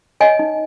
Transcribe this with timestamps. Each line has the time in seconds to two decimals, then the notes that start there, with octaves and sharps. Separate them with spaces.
0.20 C#5 D#5 G#5
0.39 D#4